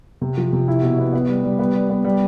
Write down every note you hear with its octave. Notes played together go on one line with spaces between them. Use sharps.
C3
F3
C3
E4
B2
B3
B3
G3
G3
B3
G3
B3
G3